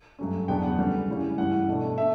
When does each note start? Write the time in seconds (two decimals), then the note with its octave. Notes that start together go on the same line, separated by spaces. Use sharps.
0.19 G2 F#3 A3 C#4
0.48 E2 C#3 F#3 B3 D4 G5
0.63 F#5
0.78 D3 G3 C#4
1.08 C#3 E3 G3 C#4
1.38 G2 E3 G3 F#5
1.68 B2 A3 D4
1.97 B2 A3 E5